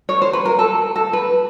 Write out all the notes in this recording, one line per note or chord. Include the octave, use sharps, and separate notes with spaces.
C#5
C5
B4
A#4
A4
A4
B4